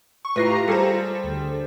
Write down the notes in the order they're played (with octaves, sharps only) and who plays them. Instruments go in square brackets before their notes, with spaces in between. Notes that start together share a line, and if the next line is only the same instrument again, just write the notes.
[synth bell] C#6
[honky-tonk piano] A2 A#6 C7 [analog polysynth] F4 G4 A#5 [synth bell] B4
[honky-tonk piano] G3 G#4 C5 [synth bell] A4
[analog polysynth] D2